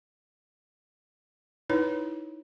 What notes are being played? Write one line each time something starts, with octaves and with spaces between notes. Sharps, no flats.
D#4 E4 B4 C#5